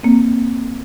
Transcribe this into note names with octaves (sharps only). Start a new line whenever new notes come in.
A#3 C4